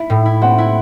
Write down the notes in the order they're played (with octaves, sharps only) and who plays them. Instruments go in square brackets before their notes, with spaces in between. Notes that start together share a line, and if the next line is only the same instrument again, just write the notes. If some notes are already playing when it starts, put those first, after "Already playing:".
Already playing: [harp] E4 [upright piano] E5
[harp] A2
E4
[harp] C4 [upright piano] F#5
[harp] E4